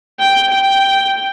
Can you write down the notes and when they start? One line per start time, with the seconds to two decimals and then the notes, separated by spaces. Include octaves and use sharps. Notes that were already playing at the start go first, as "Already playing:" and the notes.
0.19 G5
0.51 G5